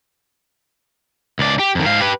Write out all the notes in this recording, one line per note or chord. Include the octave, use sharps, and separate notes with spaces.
C#2 D5
G4
F2 D#3
G#2 F5
G4 B4